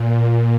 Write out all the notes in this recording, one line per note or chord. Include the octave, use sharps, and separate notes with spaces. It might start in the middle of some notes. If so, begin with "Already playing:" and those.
Already playing: A#2